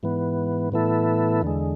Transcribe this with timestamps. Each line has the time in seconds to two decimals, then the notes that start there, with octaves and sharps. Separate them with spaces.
0.03 G#2 E3 B3
0.72 A2 E3 B3 E4 A4
1.42 E2 D3 G#3